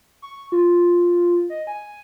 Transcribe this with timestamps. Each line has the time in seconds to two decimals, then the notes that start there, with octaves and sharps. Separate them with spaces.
0.22 C#6
0.52 F4
1.50 D#5
1.67 G#5